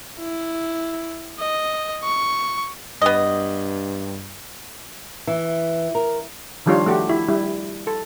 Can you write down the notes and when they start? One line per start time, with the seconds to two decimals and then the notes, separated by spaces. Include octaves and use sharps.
0.20 E4
1.39 D#5
2.04 C#6
3.02 G2 B3 D#5
5.27 E3
5.95 A#4
6.66 D#3 F3 G3 D4 F4 C#5
6.86 A3 F#4 G4
7.09 E4
7.28 G3 E4
7.87 A4